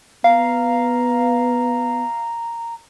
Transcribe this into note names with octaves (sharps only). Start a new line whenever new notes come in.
B3 F5 A#5